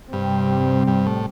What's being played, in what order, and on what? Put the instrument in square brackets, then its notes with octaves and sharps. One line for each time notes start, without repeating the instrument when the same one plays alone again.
[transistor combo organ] G2 [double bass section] C3 G3 C4
[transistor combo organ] G2
A2